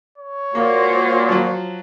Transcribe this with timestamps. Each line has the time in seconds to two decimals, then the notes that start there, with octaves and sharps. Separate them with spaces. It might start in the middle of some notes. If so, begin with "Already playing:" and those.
0.18 C#5
0.55 A#2 A#3 F#4 C5
1.29 F3 F#3